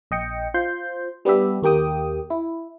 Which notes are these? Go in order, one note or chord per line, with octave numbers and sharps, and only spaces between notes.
A#1 D#5 G5 C#7
F4 C5 C6 G6
G3 B3 D4 G4 E5
D#2 A#3 G4 G5 D#6
E4